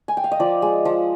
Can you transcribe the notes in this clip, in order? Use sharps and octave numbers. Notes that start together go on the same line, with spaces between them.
G#5
G5
F5
D#5
F3 D5
G#3
F3